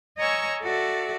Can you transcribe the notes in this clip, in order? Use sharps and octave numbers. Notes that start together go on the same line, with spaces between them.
C#5 D#5 G#5 A#5 C#6 E6
F#4 A4 D5 E5